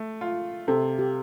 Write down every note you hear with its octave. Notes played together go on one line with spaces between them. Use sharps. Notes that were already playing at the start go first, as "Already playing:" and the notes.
Already playing: A3
F4
C3 A4
G4